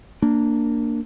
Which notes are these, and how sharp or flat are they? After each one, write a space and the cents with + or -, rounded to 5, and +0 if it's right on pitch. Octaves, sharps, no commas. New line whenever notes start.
A#3 -10 D4 +0